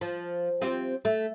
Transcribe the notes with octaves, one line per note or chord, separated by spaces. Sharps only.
F3
C4 F4 G4
A3